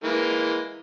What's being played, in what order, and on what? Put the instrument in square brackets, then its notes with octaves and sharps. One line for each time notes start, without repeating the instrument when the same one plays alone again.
[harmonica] E3 G#3 A#3